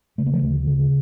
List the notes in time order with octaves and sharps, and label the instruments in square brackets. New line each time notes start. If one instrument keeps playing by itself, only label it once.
[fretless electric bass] C#3 A3
A#3
F3 A3
D2
C#3